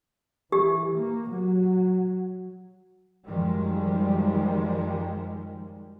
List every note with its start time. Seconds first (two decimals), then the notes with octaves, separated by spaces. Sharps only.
0.52 E3 G4
0.97 A#3
1.30 F#3
3.25 F#2 D#3 F3 G3 G#3